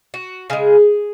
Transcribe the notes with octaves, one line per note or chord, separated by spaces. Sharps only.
F#4
C#3 G#3 G#4